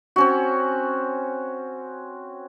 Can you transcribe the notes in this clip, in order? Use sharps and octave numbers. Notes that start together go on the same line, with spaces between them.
C4 C#4 F#4